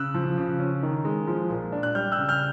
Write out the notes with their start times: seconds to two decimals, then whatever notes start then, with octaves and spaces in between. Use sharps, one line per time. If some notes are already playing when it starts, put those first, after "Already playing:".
Already playing: C#3 E6 F#6
0.14 F3
0.38 C#3
0.60 C#4
0.83 D#3
1.05 G#3
1.28 F3
1.50 A#2
1.72 D4
1.83 F#6
1.94 G3 F6 G6
2.12 E6 F#6
2.18 C#3
2.29 F6 G6